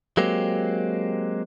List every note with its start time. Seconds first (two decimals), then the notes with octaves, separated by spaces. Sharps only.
0.17 F#3 G#3 A#3 C4 G4